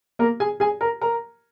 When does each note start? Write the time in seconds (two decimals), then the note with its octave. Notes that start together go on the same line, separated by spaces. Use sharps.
0.19 A#3 A#4
0.40 G#4 G#5
0.60 G#4 G#5
0.81 A#4 A#5
1.01 A#4 A#5